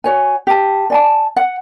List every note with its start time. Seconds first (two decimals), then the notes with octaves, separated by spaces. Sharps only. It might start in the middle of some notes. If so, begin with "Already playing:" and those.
0.04 F#4 C#5 G#5
0.47 G4 A5
0.90 D5 G#5 A5
1.36 F#5